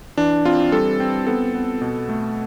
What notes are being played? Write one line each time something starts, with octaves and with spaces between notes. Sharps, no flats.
E3 D4
C4 F4
G3 A4
C4
B3 A4
B3
B2
A3